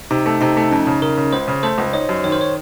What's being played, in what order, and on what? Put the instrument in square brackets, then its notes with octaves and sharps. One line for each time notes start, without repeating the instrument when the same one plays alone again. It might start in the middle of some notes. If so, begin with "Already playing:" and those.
[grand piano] C3 [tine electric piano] D#4
[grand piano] A3
[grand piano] C3 [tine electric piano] D#4
[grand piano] A3
[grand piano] F2 [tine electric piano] C#4
[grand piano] C#3
[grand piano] C#3 [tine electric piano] A#4
[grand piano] C#3
[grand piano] C#2 [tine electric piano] C5
[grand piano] C#3
[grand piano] A3 [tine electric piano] C5
[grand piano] C#2
[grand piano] D#4 [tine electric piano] C#5
[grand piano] F#2
[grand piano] D#3 [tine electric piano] C#5
[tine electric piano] C5
C#5